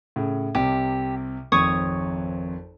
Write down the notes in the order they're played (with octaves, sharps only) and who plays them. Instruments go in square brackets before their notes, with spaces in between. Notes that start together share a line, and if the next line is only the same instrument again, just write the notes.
[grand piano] A2 C#3
[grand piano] C2 C3 [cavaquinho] G4
[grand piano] G#1 F2 [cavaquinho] C#5 C#6 D#6